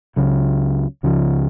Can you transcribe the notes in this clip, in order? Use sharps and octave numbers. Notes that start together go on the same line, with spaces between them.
C#2 C#3 F#3
C#2 C#3 F3